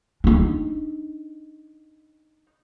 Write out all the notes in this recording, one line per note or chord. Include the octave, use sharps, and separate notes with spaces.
D4 D#4